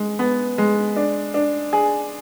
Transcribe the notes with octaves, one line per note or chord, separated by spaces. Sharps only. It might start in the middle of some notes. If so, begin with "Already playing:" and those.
Already playing: G#3
B3
G#3
D4
D4
G#4